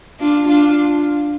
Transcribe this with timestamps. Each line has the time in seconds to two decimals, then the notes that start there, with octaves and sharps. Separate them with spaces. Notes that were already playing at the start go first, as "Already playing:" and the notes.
0.20 D4 F4
0.48 D4 F4